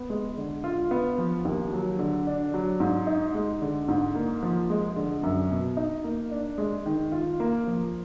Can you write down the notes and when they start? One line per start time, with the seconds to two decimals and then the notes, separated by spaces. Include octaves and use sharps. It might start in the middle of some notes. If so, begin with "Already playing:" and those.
Already playing: B3
0.10 G#3
0.37 D3
0.64 F4
0.91 B3
1.18 F3
1.45 D#2
1.73 F#3
1.99 D3
2.27 D4
2.54 F#3
2.80 G#2
3.07 D#4
3.34 G#3
3.62 D3
3.88 G#2
4.15 A#3
4.43 F3
4.70 G#3
4.96 D3
5.23 F#2
5.51 B2
5.77 D#4
6.04 A#3
6.31 D4
6.58 G#3
6.86 D#3
7.12 F4
7.40 A#3
7.67 F3